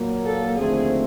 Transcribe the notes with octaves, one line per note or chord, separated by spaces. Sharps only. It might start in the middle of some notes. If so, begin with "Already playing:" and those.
Already playing: A#2 F#3 A#3
A4
D#2 D3 F3 A3 C4 G#4